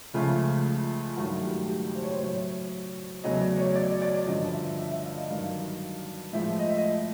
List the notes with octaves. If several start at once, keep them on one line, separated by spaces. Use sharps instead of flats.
C#2 C#3 F3 A3 F4
G2 D#3 F#3 A3 F#4
G4
G4
C5
C#5
C5
A2 F#3 A3 C#5
E2 C#3 F#3 A3 D#5
D5
C#5
D5
D5
G2 D3 F3 D#5
E5
E5
E5
F5
D#5
G2 D#3 F#3 F5
A2 F3 G#3 E5
D#5
E5
D#5